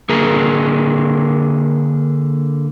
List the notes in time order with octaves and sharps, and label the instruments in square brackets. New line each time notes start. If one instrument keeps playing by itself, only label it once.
[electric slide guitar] D3 A#3 G#4 A#4 A#5